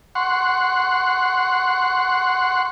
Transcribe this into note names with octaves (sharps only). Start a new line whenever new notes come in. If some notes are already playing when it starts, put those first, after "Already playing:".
F#5 C6 C#6